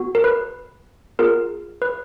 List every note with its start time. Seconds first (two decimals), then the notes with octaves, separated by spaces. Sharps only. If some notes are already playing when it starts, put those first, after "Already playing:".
Already playing: B3 F#4
0.15 A#4
0.24 B4
1.19 B3 F4 G#4 A#4
1.82 B4